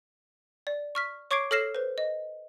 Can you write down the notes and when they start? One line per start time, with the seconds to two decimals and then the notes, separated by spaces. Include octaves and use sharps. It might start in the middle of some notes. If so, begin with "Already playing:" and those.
0.67 D5
0.95 C#6 F6 B6
1.31 C#5 C#6 D6 G#6 C7 D7
1.51 A4 C#5 F6 A#6 C7 E7
1.75 B4 C5
1.98 D#5